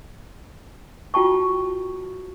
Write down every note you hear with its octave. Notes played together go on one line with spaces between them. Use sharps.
F4 F#4 G5 A5 C#6